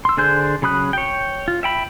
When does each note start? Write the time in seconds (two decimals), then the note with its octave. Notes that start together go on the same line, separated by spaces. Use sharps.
0.05 C6 E6
0.17 D3 D4 G#4 C5 G6
0.62 C#3 F#3 B5 D#6 F#6
0.93 C#5 G5
1.48 F4
1.63 E5 G5 B5